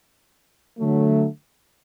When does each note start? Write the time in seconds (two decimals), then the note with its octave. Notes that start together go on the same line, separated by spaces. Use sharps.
0.78 D3 F#3 A3